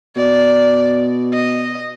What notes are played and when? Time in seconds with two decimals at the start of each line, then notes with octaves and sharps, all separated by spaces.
0.16 B2 D5
1.33 D#5